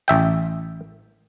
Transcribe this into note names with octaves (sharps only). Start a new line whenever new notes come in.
A1 E5 G5